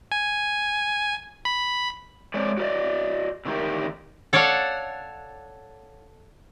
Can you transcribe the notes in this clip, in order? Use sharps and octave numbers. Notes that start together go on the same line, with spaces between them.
G#5
B5
G#3 C4 D4 C#5 D5
F#4 G4 A#4 D5 D#5
D3 D#3 A3 E4 G4 A#4
A4 C#5 D5 F5 F#5